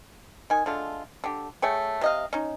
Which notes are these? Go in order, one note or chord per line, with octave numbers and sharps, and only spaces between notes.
D#3 G#5
D3 G#3 A3 F4
D3 G4
A3 G#4 C#5 G5
C3 D#5 F5
C#4 D#4